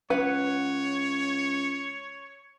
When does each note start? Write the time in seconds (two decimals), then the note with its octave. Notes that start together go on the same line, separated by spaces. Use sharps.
0.10 C#2 B4 C#5 F#5